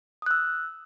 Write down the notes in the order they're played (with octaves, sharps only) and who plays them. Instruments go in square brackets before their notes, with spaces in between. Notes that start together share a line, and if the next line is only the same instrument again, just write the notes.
[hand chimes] D#6
F#6
E6